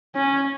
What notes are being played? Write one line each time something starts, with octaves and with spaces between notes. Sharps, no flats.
C#4